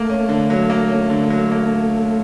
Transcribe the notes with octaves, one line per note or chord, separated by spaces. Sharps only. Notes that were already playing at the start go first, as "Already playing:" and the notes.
Already playing: A3 A#3
C#4
D3
F#3
A#3
C#4
D3
F#3
A#3